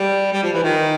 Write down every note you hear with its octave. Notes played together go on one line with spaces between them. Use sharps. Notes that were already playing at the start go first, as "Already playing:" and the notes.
Already playing: G3
G3
F3
E3
D#3